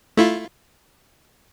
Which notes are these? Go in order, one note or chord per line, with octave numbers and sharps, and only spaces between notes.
A3 E4 F4